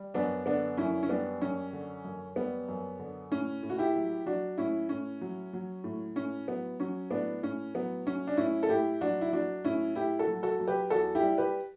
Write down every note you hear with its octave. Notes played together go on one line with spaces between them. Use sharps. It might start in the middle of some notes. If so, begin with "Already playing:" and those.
Already playing: G3
F#2 B3 D4
D3 B3 D4
F#2 C#4 E4
C#4
G3 B3 D4
F#2 C#4
D3
F#2
G3 B3
F#2
D3
A2 C#4
A2
F#4
E4 G4
F#3
F#3 D4 F#4
A2 C#4 E4
A2 C#4
F#3
F#3
A2
A2 C#4
F#3 B3
F#3 C#4
A2 B3 D4
A2 C#4
F#3 B3
F#3 C#4
D4
A2 C#4 E4
A4
A2 E4 G4
F#3 D4 F#4
E4
F#3 D4 F#4
A2 C#4 E4
A2 E4 G4
F#4 A4
F#3
F#4 A4
F#3
G4 B4
E2 F#4 A4
E4 G4
G3
G4 B4